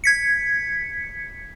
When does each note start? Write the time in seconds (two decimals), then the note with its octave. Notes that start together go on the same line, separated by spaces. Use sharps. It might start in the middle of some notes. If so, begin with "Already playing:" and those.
0.04 G#6 B6 C#7